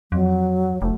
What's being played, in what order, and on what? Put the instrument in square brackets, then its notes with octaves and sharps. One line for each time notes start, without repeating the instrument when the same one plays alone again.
[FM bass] F2 [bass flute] F#3
[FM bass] F1 [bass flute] A3